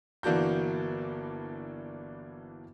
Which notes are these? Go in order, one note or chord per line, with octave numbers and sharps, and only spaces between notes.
G1 E3 A#3 D4 F#4 G6